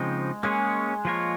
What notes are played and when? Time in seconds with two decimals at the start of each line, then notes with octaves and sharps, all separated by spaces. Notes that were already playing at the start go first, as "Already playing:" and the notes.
Already playing: C#3 F3 G#3 C4 D#4
0.43 G#3 A#3 C#4 G#4 C#5
1.05 F3 A#3 F4 A#4 C#5